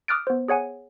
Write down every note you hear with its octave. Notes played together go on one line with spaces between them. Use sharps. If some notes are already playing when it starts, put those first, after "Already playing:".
D6 D#6 F6 F#6 A6 D7
B3 C5
G#4 C#5 F#5 G#5